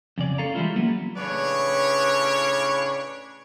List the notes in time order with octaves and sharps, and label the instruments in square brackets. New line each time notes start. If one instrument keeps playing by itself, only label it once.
[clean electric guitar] F2 C#3 D5
C#4 A4 F5 A#5
E3 G3 G#3 E4 F4
F#3 A#3 B3
[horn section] A2 C#3 D4 B4 C#5